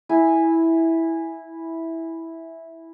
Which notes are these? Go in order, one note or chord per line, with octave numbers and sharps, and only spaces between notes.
E4 G#5